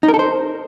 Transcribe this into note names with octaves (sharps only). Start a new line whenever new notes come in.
D#4
A#4
A4
C5